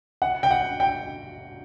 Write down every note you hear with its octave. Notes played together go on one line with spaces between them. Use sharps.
F#5
G5
F#5
G5